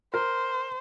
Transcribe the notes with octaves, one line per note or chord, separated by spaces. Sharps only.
A#4 C5